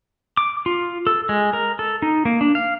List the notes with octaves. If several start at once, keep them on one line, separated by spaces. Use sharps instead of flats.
D6
F4
A4
G#3
A#4
A4
D#4
A#3
D4
F5